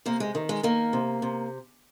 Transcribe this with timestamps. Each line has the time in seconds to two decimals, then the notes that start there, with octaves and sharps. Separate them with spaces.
0.06 C3 A#3
0.20 G#3
0.35 D#3
0.49 G#3
0.63 D#3 A#3
0.93 C3
1.22 C3